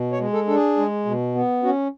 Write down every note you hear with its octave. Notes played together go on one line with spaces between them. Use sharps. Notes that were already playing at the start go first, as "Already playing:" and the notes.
Already playing: B2
C#5
G#3
A4
D4 A4
G#4
G#3
B2
B3
C#4 F#4